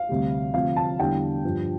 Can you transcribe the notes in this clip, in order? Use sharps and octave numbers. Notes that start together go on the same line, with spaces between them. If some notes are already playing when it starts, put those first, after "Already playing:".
Already playing: F5
D2 C3 G3
D2 C3 F3 F5
A5
E2 D3 G3 G5
G2 F3